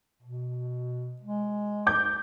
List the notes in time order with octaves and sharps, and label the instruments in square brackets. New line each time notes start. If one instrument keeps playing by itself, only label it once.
[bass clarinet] B2
G#3
[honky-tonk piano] D6 G6